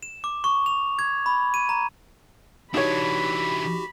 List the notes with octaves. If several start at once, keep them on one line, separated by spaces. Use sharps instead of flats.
E7
D6
C#6
F7
G#6
B5
D#7
A#5
E3 D4 D#4 F#4 G4 C#5 B5